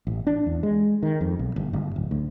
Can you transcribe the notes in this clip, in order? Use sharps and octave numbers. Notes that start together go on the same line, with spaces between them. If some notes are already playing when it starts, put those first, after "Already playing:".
A1
D4
E2
G#3
D#3
F2
B1
G1
G1
D1
D2